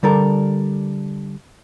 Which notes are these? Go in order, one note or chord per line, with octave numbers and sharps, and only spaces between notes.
D3 G3 A4 A#4